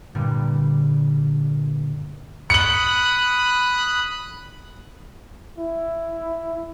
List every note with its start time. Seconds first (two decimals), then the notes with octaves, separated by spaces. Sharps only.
0.15 G2 A#2 D3 G3
2.50 B5 D#6 F#6 C#7 F#7
5.59 E4